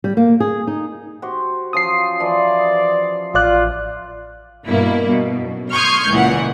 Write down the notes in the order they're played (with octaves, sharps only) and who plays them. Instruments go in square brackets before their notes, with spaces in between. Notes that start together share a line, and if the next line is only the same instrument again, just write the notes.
[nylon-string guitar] G3
A#3
G#4
D#4
[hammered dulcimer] F#4 G4 C5
[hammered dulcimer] F3 C#4 F4 [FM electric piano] D#6 C7
[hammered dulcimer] E3 F3 [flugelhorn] D5
[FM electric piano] A1 D5 F#6 [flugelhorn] F4
[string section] G2 B2 A#3 E4
B2
F#2
C6 C#6 D#6 F6 G6 G#6
C#2 A#2 E3 F#5